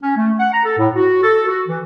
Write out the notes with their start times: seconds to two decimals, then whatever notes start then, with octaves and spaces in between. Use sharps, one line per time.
0.03 C#4
0.17 A3
0.40 F#5
0.53 A#5
0.65 A4
0.78 A2
0.94 F#4
1.23 A4
1.47 F#4
1.68 E3